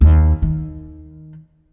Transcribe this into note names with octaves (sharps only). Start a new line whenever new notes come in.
D#2
D#3